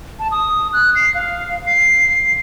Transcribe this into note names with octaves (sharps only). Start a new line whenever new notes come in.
A5
D#6
F#6
C7
F5
C7